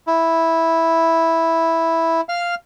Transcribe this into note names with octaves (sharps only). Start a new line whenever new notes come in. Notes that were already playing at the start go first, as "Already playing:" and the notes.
E4
F5 F6